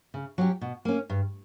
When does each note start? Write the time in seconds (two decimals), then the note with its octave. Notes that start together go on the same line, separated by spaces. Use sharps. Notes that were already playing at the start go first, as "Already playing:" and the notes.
0.14 C#3
0.38 F#3 C#4 G4
0.61 B2
0.85 A#3 C#4
1.09 G2